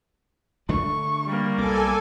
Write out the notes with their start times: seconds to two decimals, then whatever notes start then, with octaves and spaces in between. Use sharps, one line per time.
0.69 D3 A3 D4 C#6
1.26 G3 A#3
1.58 B1 B3 A4 G#5 D6